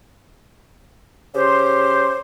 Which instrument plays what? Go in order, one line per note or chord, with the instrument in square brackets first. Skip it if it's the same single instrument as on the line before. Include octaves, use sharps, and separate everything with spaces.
[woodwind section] C#3 G4 C5